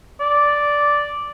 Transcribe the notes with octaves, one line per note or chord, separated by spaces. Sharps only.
D5